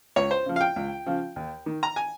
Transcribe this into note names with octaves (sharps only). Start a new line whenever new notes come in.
C#2 C#5
C5
C#3 F3
F5
G5
C#2
C#3 F3
D#2
D#3
A#5
G#5